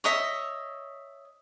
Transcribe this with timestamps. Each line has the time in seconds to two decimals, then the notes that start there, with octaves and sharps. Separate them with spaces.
0.04 C#5 D#5 E5